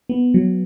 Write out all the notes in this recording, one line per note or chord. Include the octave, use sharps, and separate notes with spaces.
B3
F#3